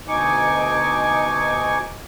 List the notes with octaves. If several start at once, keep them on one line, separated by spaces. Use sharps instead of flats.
D2 B2 D#4 G#5 C#6 D6